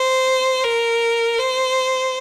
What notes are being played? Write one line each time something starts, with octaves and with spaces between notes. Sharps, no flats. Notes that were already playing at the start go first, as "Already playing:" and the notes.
Already playing: C5
A#4
C5